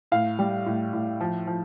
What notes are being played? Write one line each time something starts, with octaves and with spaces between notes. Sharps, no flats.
A2 F5
G3
A2
A2
F3
F3